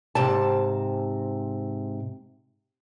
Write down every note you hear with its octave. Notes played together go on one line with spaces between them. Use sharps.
G#2 C3 A5